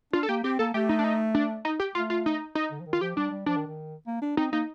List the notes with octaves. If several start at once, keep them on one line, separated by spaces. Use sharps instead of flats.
D4 F4
A4
A#3 G4
C4 G4
A#3 A4
A3 G4
D#4
D4
D#4
D4
D#4
G4
A3 F4
F4
D#4
D#4
D3
F3
D#3
F4
F3 G4
G3 D4
G3
F3 D4
D#3
D#3
A#3
D4
C4 D#4
A#3 D#4